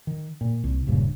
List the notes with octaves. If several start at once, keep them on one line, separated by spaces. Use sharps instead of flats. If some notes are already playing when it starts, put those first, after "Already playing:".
D#3
A#2
C2
D#1 A#1 G2 C#3